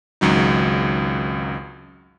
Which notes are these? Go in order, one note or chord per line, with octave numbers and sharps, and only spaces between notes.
G#1 C#2 F#3 D#4